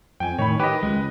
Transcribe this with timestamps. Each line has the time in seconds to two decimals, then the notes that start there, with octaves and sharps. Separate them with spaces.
0.20 F2 G5 G#5
0.39 A2 D#3 C#5 B5
0.60 D#3 G4 B4 D#5
0.83 C#2 G#3